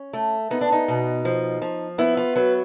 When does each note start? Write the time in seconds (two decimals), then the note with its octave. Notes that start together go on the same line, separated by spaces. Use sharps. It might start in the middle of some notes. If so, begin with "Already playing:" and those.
Already playing: C#4
0.13 A3
0.51 B3 D#4
0.61 D4
0.72 D#4
0.88 B2
1.25 F3
1.62 F3
1.98 B3 E4
2.17 F4
2.36 F#3 B4